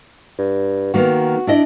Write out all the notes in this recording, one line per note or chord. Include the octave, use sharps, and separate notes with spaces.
G2
D#3 A#3 B3 F#4
D4 E4 D#5